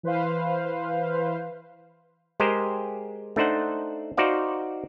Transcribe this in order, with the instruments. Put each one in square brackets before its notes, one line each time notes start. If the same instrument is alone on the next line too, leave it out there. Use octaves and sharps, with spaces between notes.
[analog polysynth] E3 B4 C5 F5
[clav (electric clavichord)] G#3 G4 G#4 A#4 C5 G5
A3 D4 D#4 C5 F#5
D#4 F#4 C5 D5 F5